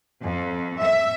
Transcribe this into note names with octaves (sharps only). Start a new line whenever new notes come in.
F2
E5